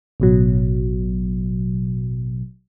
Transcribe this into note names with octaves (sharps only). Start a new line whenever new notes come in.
A1 B2 F#3